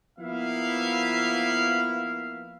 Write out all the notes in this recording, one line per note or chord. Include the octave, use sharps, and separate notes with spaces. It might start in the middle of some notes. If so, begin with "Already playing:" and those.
F3 A#3 B3 E4 E5 F5